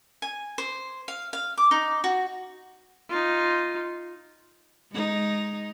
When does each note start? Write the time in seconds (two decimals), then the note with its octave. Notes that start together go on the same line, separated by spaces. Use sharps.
0.22 G#5
0.58 C5
1.08 F5
1.33 F5
1.57 D6
1.71 D#4
2.04 F#4
3.10 D#4 F4
4.91 G#3 D#4